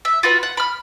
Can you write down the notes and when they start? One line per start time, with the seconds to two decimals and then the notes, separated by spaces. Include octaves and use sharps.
0.05 E5
0.23 F4 F#4 B4 F#5
0.43 F#5
0.57 B5 F6